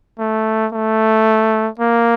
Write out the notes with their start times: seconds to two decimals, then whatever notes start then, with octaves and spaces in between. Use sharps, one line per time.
0.19 A3
0.73 A3
1.79 A#3